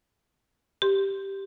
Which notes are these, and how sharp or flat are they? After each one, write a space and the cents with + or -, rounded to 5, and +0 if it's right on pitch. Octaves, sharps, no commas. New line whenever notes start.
G4 +0 C6 +0